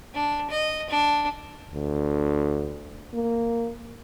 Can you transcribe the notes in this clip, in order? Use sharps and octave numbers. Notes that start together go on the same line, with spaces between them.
D4
D#5
D4
D2
A#3